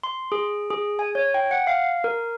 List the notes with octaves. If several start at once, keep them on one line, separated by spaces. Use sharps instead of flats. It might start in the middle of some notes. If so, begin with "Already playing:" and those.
C6
G#4
G#4
G#5
C#5
G5
F#5
F5
A#4